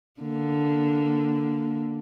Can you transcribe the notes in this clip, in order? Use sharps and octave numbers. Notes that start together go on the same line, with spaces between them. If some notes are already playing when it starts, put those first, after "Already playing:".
D3 A#3